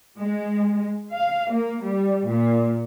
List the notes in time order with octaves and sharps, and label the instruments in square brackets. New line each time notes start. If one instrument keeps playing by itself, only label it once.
[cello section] G#3
F5
A#3
G3
A#2